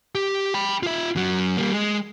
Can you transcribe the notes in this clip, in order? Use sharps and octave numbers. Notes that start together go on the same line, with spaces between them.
G4
G5 B5
F4 E5
F#2 F#3
G3 A#3
G#3